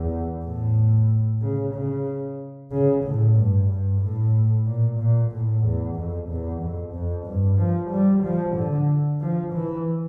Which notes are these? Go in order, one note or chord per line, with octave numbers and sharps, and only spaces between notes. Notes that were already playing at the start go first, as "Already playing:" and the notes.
Already playing: E2
A2
C#3
C#3
C#3
A2
G2
G2
A2
A#2
A#2
A2
E2
F2
E2
F2
F2
G2
F3
G3
F3
D3
F3
E3